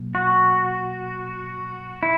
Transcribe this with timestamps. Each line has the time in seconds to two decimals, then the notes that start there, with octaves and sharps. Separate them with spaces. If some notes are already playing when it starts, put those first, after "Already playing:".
Already playing: B2 F#3 A#3
0.15 F#4
2.03 E4